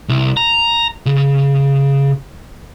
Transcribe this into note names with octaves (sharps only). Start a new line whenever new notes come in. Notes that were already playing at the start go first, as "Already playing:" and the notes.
C2
A#5
C#3